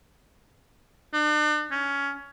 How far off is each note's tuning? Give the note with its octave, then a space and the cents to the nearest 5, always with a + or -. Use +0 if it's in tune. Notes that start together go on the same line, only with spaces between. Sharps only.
D4 +45
C#4 +15